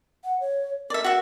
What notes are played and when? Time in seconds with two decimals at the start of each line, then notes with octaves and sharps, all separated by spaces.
0.25 F#5
0.40 C#5
0.90 A#4 D5 E5
1.04 F#4 E5